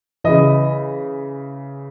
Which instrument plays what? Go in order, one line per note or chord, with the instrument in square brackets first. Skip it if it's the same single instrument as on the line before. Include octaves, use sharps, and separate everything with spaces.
[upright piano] C#3 E3 D#5